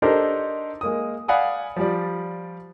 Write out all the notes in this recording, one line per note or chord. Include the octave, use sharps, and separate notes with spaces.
D4 D#4 G4 A4 A#4 C5
G#3 A#3 D#6
D5 F5 F#5 G#5 B5 D#6
F3 G3 D5